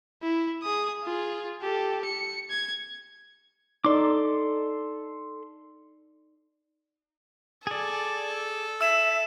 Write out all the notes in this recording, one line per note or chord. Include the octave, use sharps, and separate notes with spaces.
E4
G#4 D#6
F4 G#4
G4 A4
C#7
G#6
D#4 A4 D5 C6 D6
G#4 A4 D5
E5 E6 E7